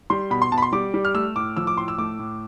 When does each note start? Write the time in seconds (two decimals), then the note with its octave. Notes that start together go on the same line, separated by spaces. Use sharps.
0.10 G3 C6
0.30 B2 B5
0.42 C6
0.52 B2 A5
0.58 B5
0.62 C6
0.72 G3 D6
0.94 G3
1.05 F6
1.15 A3 E6
1.35 A2 D6
1.57 F3 E6
1.67 D6
1.77 A2 C6
1.88 E6
1.98 A3 D6
2.19 A2